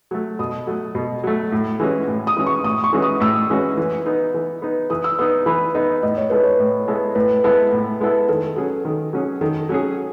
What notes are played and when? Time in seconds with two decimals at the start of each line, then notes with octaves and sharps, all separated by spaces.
0.11 F#3 A3
0.39 B2 D#6
0.67 F#3 A3
0.95 B2
1.24 F#3 A3
1.52 A2
1.80 E3 G#3 C#4 F#4
2.08 A2
2.27 D#6
2.37 E3 G#3 C#4 F#4
2.46 C#6
2.64 A2 D#6
2.84 C#6
2.93 E3 G#3 C#4 F#4
3.02 D#6
3.20 A2 E6
3.50 E3 G#3 C#4 F#4
3.77 E3
4.06 B3 D#4
4.34 E3
4.62 B3 D#4
4.90 E3 D#6
5.04 E6
5.19 B3 D#4 D#6
5.46 E3 B5
5.75 B3 D#4 D#5
6.03 A2 D#5
6.16 C#5
6.30 G#3 B3 E4 A4 B4
6.43 C#5
6.59 A2
6.88 G#3 B3 E4 A4
7.15 A2 B4
7.44 G#3 B3 E4 A4
7.72 A2
8.00 G#3 B3 E4 A4
8.28 D#3 A4
8.56 F#3 C#4 G#4
8.85 D#3
9.13 F#3 C#4 G#4
9.41 D#3 A4
9.69 F#3 C#4 G#4